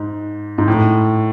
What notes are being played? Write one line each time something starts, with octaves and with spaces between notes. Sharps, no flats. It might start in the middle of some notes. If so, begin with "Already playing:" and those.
Already playing: G#2
G#2
A2